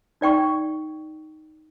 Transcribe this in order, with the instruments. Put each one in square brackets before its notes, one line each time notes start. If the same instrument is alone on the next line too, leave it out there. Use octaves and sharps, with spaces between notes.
[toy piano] D#4 D5 G5 C#6